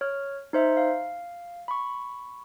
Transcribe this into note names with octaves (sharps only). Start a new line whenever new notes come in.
C#5 F6
D#4 C5 E5
F5
B5 C#6